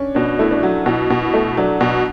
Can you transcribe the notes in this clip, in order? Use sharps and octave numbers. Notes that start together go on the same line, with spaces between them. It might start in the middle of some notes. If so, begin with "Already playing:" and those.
Already playing: C#4 D4
B2 D4
A3 E4
D4
F#3
B2 E4
B2
E4
A3
F#3 D4
B2